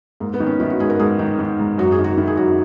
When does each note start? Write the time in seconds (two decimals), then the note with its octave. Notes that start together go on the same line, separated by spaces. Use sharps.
0.20 G#2 A#3
0.34 B3
0.40 D#3
0.46 C#4
0.60 D#3 E4
0.70 F#4
0.79 G#2 G#4
0.90 A#4
0.99 G#2 G#4
1.19 D#3
1.39 D#3
1.59 G#2
1.78 F#2 F#4
1.92 G#4
1.99 D#3
2.04 F#4
2.17 D#3 E4
2.27 G#4
2.37 F#2 F#4
2.47 E4